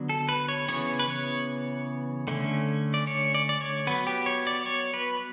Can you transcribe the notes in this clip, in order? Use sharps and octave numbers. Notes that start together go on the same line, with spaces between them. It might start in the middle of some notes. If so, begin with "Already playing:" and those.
Already playing: D3 F#3 B3
A4
B4
C#5
C#3 E3 B3 C#5
B4
C#5
D3 A3 C#4
D5
C#5
D5
D5
C#5
F#3 B3 B4
G4
C#5
D5
C#5
B4